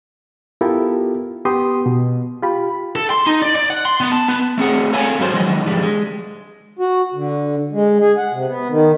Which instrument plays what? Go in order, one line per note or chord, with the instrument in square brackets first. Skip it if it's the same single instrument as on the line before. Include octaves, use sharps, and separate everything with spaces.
[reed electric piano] B3 E4 F4 G4 A4 A#4
B3 G4 B4 C6 D#6
B2
F4 G4 B5
[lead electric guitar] A4
C6
D#4
D5
D5
F#5
C6
B3
A5
B3
[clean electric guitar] A3 C4 G#4 F#5
A4 C#5 F5 G#5 A#5
G#2 F#3 G#4 C5
D#3 F3 F#3 G#3 D#4
G#2 D3 F3 G3 G#3
G#3
[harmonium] F#4
D3
G#3
G#4
F#5
C3
B3
D#3